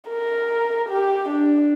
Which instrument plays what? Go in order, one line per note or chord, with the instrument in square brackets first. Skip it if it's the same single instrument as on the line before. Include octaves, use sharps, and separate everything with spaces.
[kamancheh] A#4
G4
D4